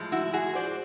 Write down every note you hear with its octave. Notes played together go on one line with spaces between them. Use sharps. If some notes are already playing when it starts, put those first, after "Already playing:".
Already playing: A2 F3 G#3
E4 F#4
F#4 G#4
C5 D5